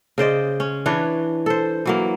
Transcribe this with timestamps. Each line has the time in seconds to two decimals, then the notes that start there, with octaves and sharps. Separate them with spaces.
0.18 C#3 C5 D5 D#5
0.60 C#4
0.86 E3 D4 B4 C#5
1.46 A4 C5
1.86 E3 F#3 A#3